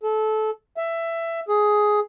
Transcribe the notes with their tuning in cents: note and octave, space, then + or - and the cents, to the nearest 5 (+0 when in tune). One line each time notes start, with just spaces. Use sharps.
A4 -20
E5 +15
G#4 +10